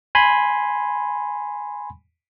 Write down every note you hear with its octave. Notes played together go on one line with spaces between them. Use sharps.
G#5 B5 C6